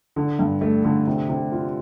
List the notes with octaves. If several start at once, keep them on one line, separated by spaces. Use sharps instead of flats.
D3
G2
A3
D3
C3
C3
F4